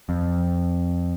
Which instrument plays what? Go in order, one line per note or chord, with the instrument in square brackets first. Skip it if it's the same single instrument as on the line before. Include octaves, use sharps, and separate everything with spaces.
[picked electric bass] F2